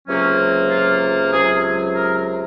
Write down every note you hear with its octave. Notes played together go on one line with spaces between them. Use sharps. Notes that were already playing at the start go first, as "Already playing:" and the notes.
C#2 C3 F#3 A#3 C#4
F4
C#2 C3 F#3 G#4
A#4